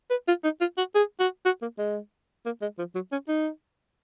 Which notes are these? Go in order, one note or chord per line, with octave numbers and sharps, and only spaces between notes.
B4
F4
D#4
F4
F#4
G#4
F#4
F#4
A#3
G#3
A#3
G#3
F3
F#3
C#4
D#4